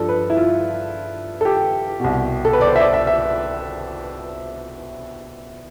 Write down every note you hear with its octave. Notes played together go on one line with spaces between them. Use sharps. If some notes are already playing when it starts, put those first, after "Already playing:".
Already playing: G2 F3 A4
B4
E4
F4
A4
G4
C2 B2
A4
B4
D5
C5
E5
D5
E5
E5